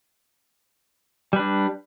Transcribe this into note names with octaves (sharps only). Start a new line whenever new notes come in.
G3 D4 B4